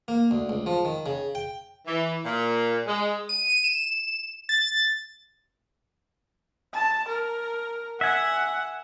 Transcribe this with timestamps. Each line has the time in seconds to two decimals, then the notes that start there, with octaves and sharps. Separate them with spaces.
0.08 A#3
0.31 D2
0.49 C#2
0.66 F3
0.85 D#3
1.06 C#3
1.35 G5
1.88 E3
2.25 A#2
2.87 G#3
3.29 D#7
3.64 E7
4.49 A6
6.74 A5
7.08 A#4
8.01 E5 F#5 G#5